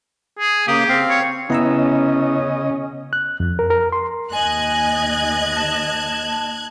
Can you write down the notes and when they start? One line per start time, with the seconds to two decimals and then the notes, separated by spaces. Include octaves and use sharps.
0.39 G#4
0.68 C#3 A#3 G4 D#6
0.89 C4 F5
1.09 C#5
1.50 C#3 B3 C#4 E4 D#5 A#5 E6
3.13 F#6
3.40 F2
3.59 A#4
3.70 A#4
3.92 C6
4.33 D#2 D#5 G#5 F#6 G#6
5.56 A5